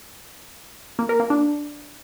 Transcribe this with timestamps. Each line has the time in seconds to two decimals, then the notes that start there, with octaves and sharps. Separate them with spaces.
0.99 A#3
1.09 A#4
1.20 A#3
1.30 D4